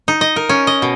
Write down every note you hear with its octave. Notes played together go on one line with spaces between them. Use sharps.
D#4
D#5
A#4
C#4
D#5
B2